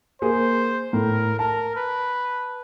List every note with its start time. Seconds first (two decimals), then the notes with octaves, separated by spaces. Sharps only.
0.22 A#3 G#4 C5
0.93 A2 A#4
1.39 A#4 A5
1.76 B4